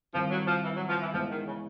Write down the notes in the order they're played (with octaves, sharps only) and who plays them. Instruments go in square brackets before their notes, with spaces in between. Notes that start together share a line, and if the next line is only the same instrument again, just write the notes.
[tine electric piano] D#3 G3 C4 E4 [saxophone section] F3
[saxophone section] F#3
F3
E3
F#3
F3
E3
[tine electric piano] E3 G#3 B3 E4 [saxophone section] F3
[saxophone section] D#3
C#3